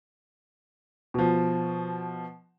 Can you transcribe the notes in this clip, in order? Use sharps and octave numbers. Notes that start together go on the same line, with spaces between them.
B2 F3